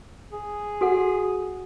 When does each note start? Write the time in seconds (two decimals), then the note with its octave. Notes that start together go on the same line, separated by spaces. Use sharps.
0.32 G#4
0.81 F#4 A4 F#5